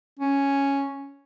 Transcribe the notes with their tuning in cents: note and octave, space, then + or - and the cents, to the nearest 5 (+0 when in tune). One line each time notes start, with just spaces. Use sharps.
C#4 +0